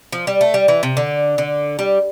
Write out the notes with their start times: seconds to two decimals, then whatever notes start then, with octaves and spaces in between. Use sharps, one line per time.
0.12 F3
0.27 G3
0.41 A3
0.54 G3
0.68 E3
0.83 C3
0.97 D3
1.38 D3
1.79 G3